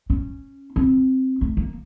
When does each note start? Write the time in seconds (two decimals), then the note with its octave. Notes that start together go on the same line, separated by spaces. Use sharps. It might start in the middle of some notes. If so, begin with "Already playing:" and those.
0.10 C#4
0.76 C4
1.41 A3
1.57 A#3